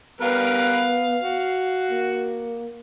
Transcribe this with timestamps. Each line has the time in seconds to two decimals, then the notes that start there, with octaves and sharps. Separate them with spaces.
0.21 G3 B3 A#4 B4 F5
1.22 F#4
1.91 A#3